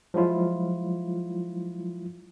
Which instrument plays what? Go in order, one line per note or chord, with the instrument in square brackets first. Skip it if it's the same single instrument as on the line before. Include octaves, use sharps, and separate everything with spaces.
[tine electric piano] F3 F#3 G#3 E4 F4